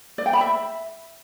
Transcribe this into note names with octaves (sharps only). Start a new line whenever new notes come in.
D5
G5
B5
E5